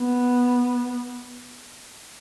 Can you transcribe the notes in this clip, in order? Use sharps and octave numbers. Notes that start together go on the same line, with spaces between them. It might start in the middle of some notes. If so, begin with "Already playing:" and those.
Already playing: B3